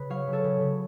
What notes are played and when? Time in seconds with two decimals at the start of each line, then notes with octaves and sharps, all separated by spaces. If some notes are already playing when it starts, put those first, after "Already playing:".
Already playing: C#3 B4
0.10 F#3 C#5 F5
0.27 C#3
0.33 A4 C#5
0.44 C#3
0.60 C#3